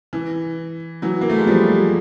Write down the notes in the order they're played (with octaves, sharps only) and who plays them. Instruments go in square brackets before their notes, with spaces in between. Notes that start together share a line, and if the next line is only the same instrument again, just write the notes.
[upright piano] E3
E3 F#3
A#3
A3
G#3
F3 G3